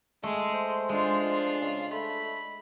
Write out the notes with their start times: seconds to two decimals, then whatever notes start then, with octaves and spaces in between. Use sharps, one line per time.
0.23 G#3 A3
0.54 C5
0.89 G#3 D4 F4
1.22 F3
1.62 C#3
1.93 A3 B5